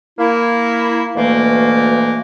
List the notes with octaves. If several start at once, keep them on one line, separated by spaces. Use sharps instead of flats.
A#3 E4
D2 B2 E3 A3 A#3